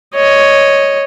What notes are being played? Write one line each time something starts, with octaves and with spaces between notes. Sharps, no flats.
C#5 D#5